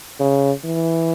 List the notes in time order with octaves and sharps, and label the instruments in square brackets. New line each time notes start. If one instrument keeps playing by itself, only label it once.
[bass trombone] C#3
E3